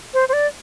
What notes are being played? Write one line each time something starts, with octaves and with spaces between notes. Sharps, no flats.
C5
C5
D5